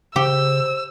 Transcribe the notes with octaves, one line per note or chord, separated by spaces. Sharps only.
C#3 G4 C5 E6